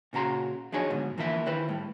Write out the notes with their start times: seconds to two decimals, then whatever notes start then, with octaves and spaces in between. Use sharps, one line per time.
0.13 A#2 C#3 F#4 A#5 C6
0.72 F3 F#3 D4 D#4 G#4 C#5
0.90 D2 G#2 B2
1.18 E3 F3 A#3 D4 E4 E5
1.46 D#3 E4 B4 C5
1.69 A2 G3